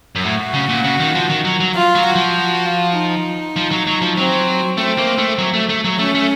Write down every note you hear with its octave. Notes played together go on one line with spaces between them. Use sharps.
F#2
A2 F#4
C#3
A#2
C#3
D#3
F3
D#3
F#3
F#3
F4
F#3
F#4
F3
F#4
F4
D#4
F3
F#3
F#3
F3
F#3 C4
A3 C4
A#3
A3
F#3
A3
A3
F#3
A3 C#4
A3